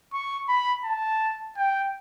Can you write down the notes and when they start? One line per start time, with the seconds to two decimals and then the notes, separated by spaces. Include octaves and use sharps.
0.13 C#6
0.49 B5
0.85 A5
1.57 G5